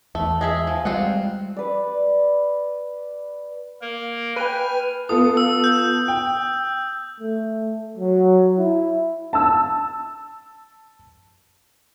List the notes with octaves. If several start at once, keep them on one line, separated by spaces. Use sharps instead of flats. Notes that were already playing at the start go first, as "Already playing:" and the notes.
E2 A3
G#3 G#4 E5
F3
G3 G#3 C4 F4 F#5
B4 D5
A#3 A#4
B4 G5 G#5 F6
B3 F4 A4 D#6
E6
G6
G5
A3
F#3
E4
A5 E6